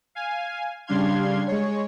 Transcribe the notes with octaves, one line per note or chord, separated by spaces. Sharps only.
F5 G#5
C#3 G3 D4 F5 C6 G#6
G#3 C#5